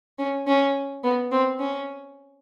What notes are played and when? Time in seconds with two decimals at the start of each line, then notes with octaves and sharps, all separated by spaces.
0.19 C#4
0.47 C#4
1.04 B3
1.32 C4
1.60 C#4